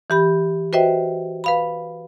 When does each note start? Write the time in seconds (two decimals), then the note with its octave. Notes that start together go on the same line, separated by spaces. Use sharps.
0.10 E3 G4 B5
0.73 F#4 B4 C5 D#5 E5 G5
1.44 B4 F5 B5